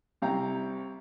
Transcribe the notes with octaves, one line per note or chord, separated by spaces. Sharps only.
C2 C3 F5 G5 A#5